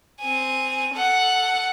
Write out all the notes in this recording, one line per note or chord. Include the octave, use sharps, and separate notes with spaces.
C4 G#5
A4 F#5